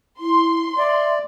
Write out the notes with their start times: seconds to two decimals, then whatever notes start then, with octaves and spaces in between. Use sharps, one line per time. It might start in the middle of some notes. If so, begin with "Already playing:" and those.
0.20 E4 C6
0.78 D5 E5